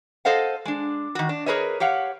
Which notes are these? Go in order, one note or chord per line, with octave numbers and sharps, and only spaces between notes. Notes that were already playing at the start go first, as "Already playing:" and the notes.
A4 C5 D#5 F5 F#5
G#3 D4
D#3 F#4
D4
G#4 A#4 B4 C#5 D#5
G4 C#5 F5 F#5